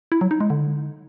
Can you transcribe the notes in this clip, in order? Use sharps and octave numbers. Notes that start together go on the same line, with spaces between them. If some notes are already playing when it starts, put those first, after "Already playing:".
E4
F#3
D#4
G#3
D3